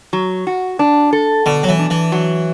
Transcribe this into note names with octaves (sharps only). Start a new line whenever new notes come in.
F#3
F#4
D4
A4
B2 D3
F#3
E3
D4
E3
F#3